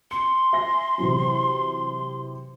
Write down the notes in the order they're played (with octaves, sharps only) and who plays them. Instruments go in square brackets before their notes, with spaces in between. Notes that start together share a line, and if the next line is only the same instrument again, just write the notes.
[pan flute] C6 [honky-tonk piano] C#7
[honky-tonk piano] E5 G#5 A#6
C3 E3 F#3